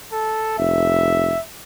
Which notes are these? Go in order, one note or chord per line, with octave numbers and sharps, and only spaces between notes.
A4
F1 E5